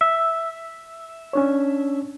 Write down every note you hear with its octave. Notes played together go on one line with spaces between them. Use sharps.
E5
C#4 D4 C#5